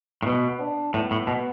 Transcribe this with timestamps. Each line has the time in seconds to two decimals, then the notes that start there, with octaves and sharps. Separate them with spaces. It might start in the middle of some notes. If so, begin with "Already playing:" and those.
0.23 A2
0.26 B2 B3
0.60 D4
0.94 A2 B3
1.11 A2
1.27 B2